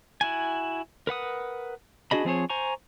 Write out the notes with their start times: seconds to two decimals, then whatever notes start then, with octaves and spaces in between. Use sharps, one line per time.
0.21 E4 F#4 G#5
1.07 A#4 B4 F#5 D#6
2.11 D4 F#4 G#4 D#5 B5
2.25 F3 C4 G#4 C#5
2.50 C5 G#5 A#5 C#6